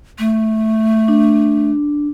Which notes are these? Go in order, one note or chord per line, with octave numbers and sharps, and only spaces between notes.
A3
D4